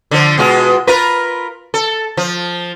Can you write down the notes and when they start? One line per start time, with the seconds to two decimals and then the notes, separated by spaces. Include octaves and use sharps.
0.11 D3 F3
0.38 B2 G#3 F4
0.87 F4 A#4 B4
1.74 A4
2.17 F3